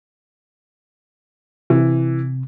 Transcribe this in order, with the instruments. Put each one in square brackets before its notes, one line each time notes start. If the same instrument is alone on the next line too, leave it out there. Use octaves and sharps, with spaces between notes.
[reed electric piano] C3 [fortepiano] E3